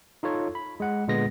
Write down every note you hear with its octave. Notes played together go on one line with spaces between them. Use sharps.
D#4 F4 A4 C#5
B5
G#3 F#5
A#2 D3 G#3 B3 A#6